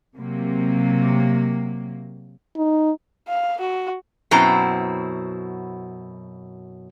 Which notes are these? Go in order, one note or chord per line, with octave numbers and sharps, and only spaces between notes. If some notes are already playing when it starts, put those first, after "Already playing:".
C3 F#3 A#3
D#4
F5
F#4
F#2 B2 C4 E4 A#5